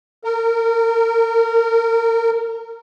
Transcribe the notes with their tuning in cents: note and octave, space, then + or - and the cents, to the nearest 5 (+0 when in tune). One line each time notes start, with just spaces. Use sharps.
A#4 -25